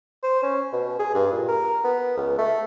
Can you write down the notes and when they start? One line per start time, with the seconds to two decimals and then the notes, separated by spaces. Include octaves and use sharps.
0.23 C5
0.42 C#4
0.72 B2
0.99 G#4
1.14 G2
1.32 A#2
1.48 A#4
1.84 B3
2.17 C#2
2.38 A3